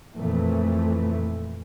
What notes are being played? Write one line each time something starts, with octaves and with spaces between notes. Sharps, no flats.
F2 A#2 E3 A3